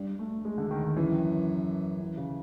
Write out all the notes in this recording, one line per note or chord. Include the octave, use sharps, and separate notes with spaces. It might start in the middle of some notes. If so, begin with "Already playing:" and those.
Already playing: G2
A3
G#3
D3
D#3
D#3
F#2 E3
E3
C#3